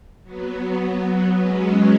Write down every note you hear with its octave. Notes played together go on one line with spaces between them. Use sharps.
F#3 B3
F#3 B3
G#3 C#4